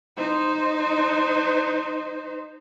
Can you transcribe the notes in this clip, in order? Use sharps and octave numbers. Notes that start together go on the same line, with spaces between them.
D#4 C5